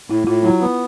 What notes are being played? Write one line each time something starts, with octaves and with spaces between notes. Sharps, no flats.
A2 E4
A2 F4
F#3 E4
B3